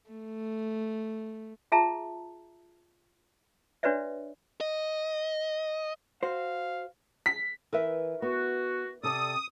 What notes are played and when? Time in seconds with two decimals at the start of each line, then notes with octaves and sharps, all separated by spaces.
0.10 A3
1.72 F4 G#4 E5 A5 A#5
3.83 D4 F#4 B4 C#5 D5 E5
4.61 D#5
6.23 F#4 C5 F5
7.26 B6
7.73 E3 A#4 B4 E5
8.22 B3 F#4
9.03 C3 A4 D5 A5 D#6